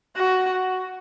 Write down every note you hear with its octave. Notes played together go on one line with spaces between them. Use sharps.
F#4